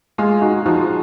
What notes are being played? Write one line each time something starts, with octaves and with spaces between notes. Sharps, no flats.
G#3 F4 G#4
D#4 F#4
F3 D#4 F#4